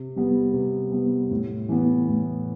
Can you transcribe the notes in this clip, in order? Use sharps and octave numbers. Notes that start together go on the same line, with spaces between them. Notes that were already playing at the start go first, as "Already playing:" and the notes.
Already playing: C3
G3 B3
C3
G3 B3
A2
E3 B3
A2